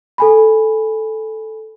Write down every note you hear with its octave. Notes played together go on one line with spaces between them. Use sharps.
A4 G#5 B5